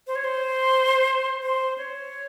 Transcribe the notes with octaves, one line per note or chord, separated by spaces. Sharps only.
C5
C#5
C5
C5
C#5